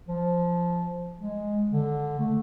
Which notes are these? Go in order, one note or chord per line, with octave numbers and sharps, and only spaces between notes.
F3
G#3
D3
A3